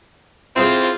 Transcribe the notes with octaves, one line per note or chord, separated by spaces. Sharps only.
C4 E4 F4 G#4 C5